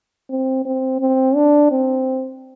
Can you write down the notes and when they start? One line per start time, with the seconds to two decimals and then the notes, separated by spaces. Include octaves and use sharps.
0.30 C4
0.65 C4
1.00 C4
1.35 D4
1.71 C4